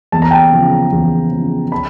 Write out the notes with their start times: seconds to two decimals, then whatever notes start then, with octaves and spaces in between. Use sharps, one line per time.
0.12 E2 A5
0.22 A#5
0.31 G5 A5
0.53 C#3 F3
0.92 E2
1.32 C#3 F3
1.72 A5 B5